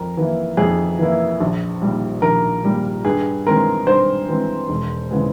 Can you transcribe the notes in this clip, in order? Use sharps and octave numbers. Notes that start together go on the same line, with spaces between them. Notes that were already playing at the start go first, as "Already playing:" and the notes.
Already playing: F2 A#4
E3 A#3 E4
F2 G#4
E3 A#3 E4
A#1
A#2 G3
A#1 A#4
A#2 G3
G2 G#4
E3 G#3 C4 A#4
G2 C5
E3 G#3 C4
E1
C#3 E3 G#3